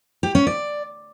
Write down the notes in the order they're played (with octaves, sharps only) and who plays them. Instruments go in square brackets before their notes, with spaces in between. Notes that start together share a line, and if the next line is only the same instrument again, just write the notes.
[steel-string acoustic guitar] G4
C#4
D5